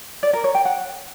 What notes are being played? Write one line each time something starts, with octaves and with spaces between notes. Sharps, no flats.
D5
A#4
C#5
G5
F#5